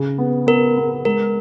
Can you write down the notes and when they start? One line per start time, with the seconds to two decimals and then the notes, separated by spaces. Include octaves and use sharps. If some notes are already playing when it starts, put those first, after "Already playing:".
Already playing: C#3
0.18 B3
0.47 B3 A#4
0.77 B3
1.05 G#3 A#4